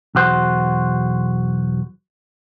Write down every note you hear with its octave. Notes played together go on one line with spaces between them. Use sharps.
B1 E2 F#4 C5